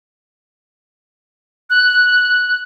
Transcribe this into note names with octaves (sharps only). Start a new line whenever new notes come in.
F#6